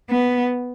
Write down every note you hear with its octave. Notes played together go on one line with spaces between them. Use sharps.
B3